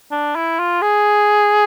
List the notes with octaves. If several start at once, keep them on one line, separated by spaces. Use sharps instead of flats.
D4
E4
F4
G#4